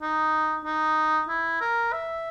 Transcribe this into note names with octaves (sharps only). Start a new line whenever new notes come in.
D#4
D#4
E4
A#4
E5